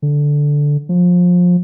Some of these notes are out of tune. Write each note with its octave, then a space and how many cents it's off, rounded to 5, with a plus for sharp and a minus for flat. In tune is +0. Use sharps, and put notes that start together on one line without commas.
D3 -5
F3 +25